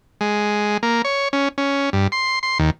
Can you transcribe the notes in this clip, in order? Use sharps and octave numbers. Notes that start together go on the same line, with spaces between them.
G#3
A#3
C#5
C#4
C#4
G2
C6
C6
D#2